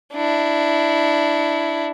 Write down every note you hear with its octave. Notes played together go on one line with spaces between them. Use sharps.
D4 E4